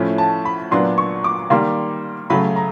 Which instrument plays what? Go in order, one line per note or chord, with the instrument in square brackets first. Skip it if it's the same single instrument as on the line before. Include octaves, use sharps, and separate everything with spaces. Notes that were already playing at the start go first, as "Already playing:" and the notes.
Already playing: [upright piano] A2 F3 A3 C#4 E4
A5
B5
A#2 F#3 B3 D4 C6
C#6
D6
D#3 G3 A#3 C6
C#3 F#3 A3 B5
A#5